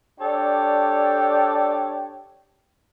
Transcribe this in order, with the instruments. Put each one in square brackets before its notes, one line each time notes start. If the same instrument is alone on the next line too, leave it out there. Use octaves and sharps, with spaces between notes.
[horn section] D4 G4 A4 C#5 D5 G5